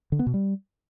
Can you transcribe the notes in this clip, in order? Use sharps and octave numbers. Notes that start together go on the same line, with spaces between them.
D3
B3
B2
G3